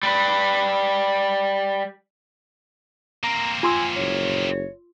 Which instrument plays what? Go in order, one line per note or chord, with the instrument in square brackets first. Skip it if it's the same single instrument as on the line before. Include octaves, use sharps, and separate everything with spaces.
[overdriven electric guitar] G3 B4
[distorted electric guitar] A#3 C4 [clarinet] A#5
[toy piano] F4 C6 E6 [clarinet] G#5
[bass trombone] F#1 [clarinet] C#5